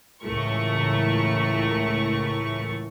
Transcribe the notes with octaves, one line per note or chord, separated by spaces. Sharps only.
C#2 A2 E3 A3 A#4 C#6